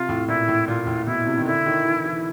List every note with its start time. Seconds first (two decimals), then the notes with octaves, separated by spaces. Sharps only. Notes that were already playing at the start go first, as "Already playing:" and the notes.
Already playing: C3 F4
0.09 A2
0.28 A#2 E4
0.48 A2
0.68 A#2 F4
0.87 A2
1.06 B2 E4
1.26 C3
1.38 D#3
1.45 D3 E4
1.66 D#3
1.85 E3
2.04 E3